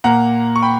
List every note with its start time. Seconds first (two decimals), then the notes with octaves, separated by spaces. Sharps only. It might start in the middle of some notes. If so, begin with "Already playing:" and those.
0.04 A#2 A#3 F#5 A#5
0.56 C#6
0.62 G5 B5